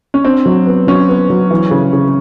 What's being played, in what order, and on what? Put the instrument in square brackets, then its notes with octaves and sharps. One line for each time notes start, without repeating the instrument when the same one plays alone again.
[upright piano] C#4
[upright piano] C4 [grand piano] D4
[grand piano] F#3
B3
[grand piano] F#3 [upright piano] C#4
[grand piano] B3
F#3
E3
C#3
C#3